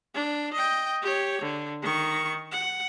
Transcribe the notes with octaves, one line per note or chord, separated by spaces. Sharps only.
D4
D#5 G5
G4 C#5
D3
D#3 C#6
F#5